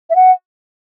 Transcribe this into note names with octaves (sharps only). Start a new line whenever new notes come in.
E5
F#5